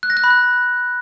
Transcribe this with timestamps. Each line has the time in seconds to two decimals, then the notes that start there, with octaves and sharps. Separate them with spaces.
0.03 F#6
0.10 A#6
0.17 F#6
0.24 B5
0.30 F#6